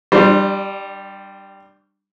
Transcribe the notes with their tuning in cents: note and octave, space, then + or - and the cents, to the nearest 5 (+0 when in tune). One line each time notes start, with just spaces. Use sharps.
G3 +0 D4 +35 C5 +0